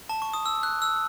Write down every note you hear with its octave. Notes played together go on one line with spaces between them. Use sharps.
A5
C#6
D#6
E6
F#6
E6